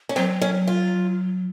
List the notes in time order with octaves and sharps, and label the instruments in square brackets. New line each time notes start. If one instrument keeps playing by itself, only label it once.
[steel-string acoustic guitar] C#4
[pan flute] F#3 [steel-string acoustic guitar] C4
[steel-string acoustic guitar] C#4
F4